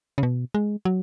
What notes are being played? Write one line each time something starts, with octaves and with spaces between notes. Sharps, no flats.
C#3
B2
G#3
F#3